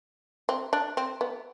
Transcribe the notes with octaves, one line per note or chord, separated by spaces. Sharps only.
C4
D4
C4
B3